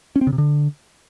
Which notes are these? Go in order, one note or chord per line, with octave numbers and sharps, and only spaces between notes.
C#4
C4
C#3
C3
D3